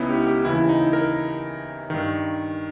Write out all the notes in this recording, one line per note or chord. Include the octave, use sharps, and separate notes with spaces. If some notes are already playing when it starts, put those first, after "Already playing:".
Already playing: C#2 B3 C#4 D#4 E4
G4
G4
D#2 C#3 E3 E4
D#4
A#4
G2 D#3